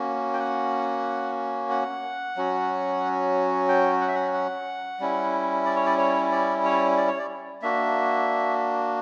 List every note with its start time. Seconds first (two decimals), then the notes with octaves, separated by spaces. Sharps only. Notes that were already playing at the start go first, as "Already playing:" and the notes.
Already playing: A#3 C#4 F#4
0.33 G5
0.40 F#5
1.70 F#5
2.37 F#3 C#4 F#4
3.69 G5
4.01 F#5
4.08 E5
4.15 F#5
4.34 F#5
5.00 G3 C#4 E4
5.65 D5
5.76 C#5
5.86 D5
5.98 C#5
6.32 D5
6.64 C#5
6.97 D5
7.08 C#5
7.19 D5
7.62 A#3 D4 F#4 E5